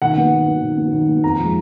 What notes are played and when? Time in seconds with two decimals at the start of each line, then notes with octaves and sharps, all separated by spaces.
0.02 D#3 F#5
0.17 F#3 B3
0.32 D#3
0.47 F#3 B3
0.62 D#3
0.77 F#3 B3
0.92 D#3
1.08 F#3 B3
1.24 F2 A#5
1.38 F3 G#3